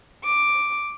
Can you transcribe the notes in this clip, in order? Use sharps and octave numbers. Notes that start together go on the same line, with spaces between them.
D6